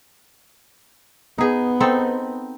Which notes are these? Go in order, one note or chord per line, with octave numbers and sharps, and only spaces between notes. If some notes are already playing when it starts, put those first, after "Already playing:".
B3 D#4 G#4
C4 D#4 A4